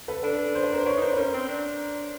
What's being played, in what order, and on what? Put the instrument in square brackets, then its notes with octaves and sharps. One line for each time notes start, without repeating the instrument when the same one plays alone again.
[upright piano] A4 B4
[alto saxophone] D4 [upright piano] A4 B4
[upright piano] C5
B4
A#4 C5
[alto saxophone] D4 [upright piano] B4 C#5
[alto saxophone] D#4 [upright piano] A#4 C5
[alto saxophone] D4
[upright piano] B4
[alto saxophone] C#4 [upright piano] A#4 C5
[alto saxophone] C4
D4